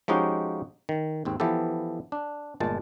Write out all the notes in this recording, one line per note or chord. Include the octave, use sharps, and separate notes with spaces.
F3 G#3 C#4 D#4 F#4 G4
D#3
D#2 G#2 C4
E3 F3 B3 G4 A4
D4
G1 A#2 G#3 A5